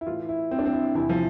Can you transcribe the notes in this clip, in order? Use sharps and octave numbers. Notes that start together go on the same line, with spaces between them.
E4
A2 E3 F4
E4
C4
D4
C4
E4
E2 C3 E3 E4
F3